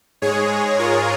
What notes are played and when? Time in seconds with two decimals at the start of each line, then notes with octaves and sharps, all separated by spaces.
0.22 G#2 G#3 G#4 C#5
0.79 F4 A#4